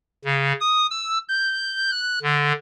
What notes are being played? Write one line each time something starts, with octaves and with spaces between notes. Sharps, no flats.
C#3
D#6
E6
G6
F#6
D3